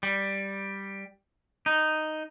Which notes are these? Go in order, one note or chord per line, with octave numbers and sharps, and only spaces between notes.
G3
D#4